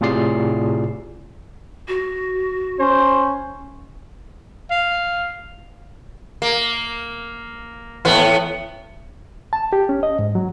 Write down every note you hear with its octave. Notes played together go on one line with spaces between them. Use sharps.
A2 C3 F4 G#4 D5 C7
F#4
C#4 C5
F5
A#3
E2 A2 B3
A5
G4
C#4
D#5
G#2
F#3